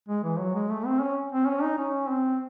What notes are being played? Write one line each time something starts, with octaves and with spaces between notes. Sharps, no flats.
G#3
E3
F#3
G#3
A3
C4
C#4
C4
C#4
D#4
C#4
C4